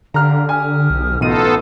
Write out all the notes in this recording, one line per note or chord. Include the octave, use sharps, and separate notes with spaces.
D3 G4 F5 A#5 F6
G4 G#5 D#6 F6
B1
A1 B2 B3 D#4 F4 A4 D#6 D#7